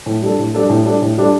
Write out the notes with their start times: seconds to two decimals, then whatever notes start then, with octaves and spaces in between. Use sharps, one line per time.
0.06 A2
0.22 G3 D4 A4
0.39 A2
0.54 G3 D4 A4
0.70 A2
0.86 G3 D4 A4
1.02 A2
1.18 G3 D4 A4